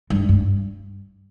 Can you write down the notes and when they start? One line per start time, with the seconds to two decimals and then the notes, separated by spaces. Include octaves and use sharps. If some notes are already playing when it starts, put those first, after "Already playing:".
0.10 G2
0.29 G2